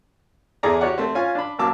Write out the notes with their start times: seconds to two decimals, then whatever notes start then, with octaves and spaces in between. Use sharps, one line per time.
0.63 E2 E4 G#4 A4 D5 A#5
0.81 F#4 G4 C#5 D5 F#5
0.98 A3 C4 C5
1.15 C#4 F4 F5 G#5
1.35 D4 B5
1.59 A1 F#3 A#3 A5 D6 E6